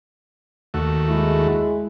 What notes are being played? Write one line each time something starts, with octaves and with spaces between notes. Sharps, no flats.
D#2 A3 F#4
G#3 E4